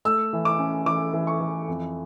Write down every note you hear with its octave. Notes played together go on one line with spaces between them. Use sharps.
A3 E6
E3
D6
C#4
E3 D6
E3
C#6
E3
F2